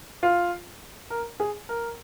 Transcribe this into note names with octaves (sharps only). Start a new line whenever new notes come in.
F4
A#4
G#4
A#4